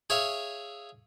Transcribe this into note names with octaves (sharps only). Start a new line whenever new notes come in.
G#4 C#5 E5 F5